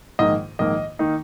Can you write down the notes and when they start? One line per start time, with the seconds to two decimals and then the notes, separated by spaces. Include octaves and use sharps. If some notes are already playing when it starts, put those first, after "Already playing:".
0.19 A#1 G#2 D#3 A#3 D#5
0.59 A#1 G#2 D#3 A#3 D#5
0.99 D#3 A#3 D#4